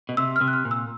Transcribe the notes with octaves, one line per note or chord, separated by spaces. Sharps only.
B2
C3 E6
F6
C3
F#6
F6
A#2
E6